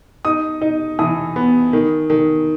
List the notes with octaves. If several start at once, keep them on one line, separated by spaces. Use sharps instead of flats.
D#4 D#6
D#4
E3 D#6
B3
D#3
D#3